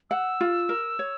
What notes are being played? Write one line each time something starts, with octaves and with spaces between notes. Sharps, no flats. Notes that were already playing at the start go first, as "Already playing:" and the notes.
F#5 E6
F4
A#4
C#5